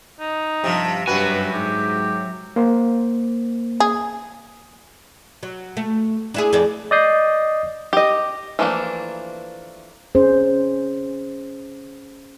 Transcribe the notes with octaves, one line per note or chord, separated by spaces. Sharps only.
D#4
G2 C3 F3
G2 C3 F#3 F#4 B4 G#5
G#2 G4
A#3 C5
G#4
F#3
A3
D4 E4 G#4
F2 G#4 D5
D5 D#5 D#6 G6 C7
G4 D#5
E3 F3 A3 A#3 D4
C#4 G#4 C5